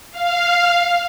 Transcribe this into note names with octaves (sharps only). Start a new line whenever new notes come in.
F5